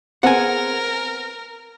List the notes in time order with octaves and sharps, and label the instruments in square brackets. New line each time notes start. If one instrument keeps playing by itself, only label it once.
[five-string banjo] B3 C4 G#4 [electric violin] A#4 [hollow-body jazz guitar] F#5 G#5